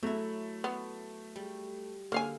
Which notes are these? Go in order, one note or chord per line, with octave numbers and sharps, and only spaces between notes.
F#3 A3 E4
B3
G3
D3 A#3 F5 G#5